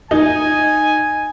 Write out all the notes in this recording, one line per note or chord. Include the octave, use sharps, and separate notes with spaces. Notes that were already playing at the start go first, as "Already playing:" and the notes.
D#4 G#5